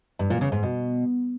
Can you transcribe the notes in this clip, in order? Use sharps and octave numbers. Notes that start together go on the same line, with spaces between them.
G2
A#2
C#3
G#2
B2